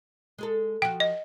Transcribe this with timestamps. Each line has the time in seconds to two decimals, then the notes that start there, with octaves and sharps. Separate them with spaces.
0.38 G#3 G#4 A4
0.82 F3 F#4 G5
1.00 D#5